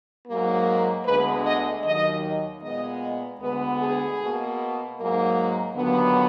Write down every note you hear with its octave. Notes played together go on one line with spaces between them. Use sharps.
G#2 F#3 A#3
D2 D3 G#3 B3 B4
D#5
D#2 D#3 F#3 D#5
A#2 G#3 B3 D#5
D2 D3 G#3 B3 B4
G#4
B2 A#3
G#2 F#3 A#3
D#2 D3 F#3 B3